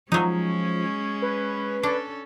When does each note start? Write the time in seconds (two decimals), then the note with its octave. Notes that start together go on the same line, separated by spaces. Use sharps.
0.12 F3 F#3 G#3 C#4 D#4
1.22 B4
1.83 C#4 D4 A4